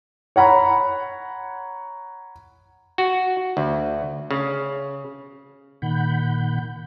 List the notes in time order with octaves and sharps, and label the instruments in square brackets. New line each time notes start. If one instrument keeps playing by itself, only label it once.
[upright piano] C#5 F#5 A#5 B5
[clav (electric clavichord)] F#4
D2
C#3
[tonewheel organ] A#2 D#3 F#5 B5 G6